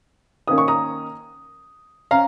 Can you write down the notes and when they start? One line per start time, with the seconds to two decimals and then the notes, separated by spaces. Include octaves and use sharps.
0.48 D#3 A#3 C#4 D#6
0.58 C#6
0.68 A#5 D#6
2.11 C#4 F5 A#5